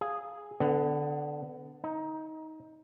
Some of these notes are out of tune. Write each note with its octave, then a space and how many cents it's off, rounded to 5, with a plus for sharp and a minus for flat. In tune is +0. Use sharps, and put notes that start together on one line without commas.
G#4 -5 F5 +0
D3 +0 B3 +30
D#4 +20 A#5 +0